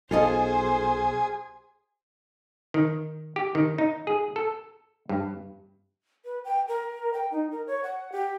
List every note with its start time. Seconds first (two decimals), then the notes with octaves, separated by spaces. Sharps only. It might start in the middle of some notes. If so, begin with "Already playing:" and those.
0.11 B1 F4 G#4 A4 C5 D#5
2.74 D#3
3.36 G4
3.55 D#3
3.78 D#4
4.07 G#4
4.36 A4
5.09 G2
6.25 B4
6.45 G5
6.68 A#4
7.14 G5
7.31 D#4
7.52 A#4
7.67 C#5
7.84 F#5
8.12 G4